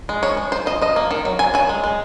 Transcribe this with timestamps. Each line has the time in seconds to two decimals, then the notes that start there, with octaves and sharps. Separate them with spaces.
0.09 G#3
0.23 F3 C#5
0.37 G#3
0.52 F3 C5
0.66 F3 D#5
0.82 F3 D#5
0.96 A#3
1.11 D#3
1.25 F#3
1.39 C4 G#5
1.54 F#3 G#5
1.69 G#3
1.84 G#3